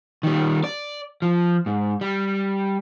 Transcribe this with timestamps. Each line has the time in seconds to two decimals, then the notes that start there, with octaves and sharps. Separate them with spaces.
0.23 D#3 G3
0.64 D5
1.22 F3
1.66 G#2
2.01 G3